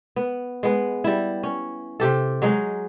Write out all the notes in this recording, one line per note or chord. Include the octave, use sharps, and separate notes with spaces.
B3
G#3 B3
G3 E4
C#4
C3 G4 A4
F#3 G#3 D#4